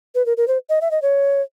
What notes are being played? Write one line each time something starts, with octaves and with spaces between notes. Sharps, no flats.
B4
A#4
A#4
C5
D#5
E5
D#5
C#5